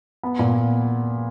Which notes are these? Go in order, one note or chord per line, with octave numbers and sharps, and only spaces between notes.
B3
A#2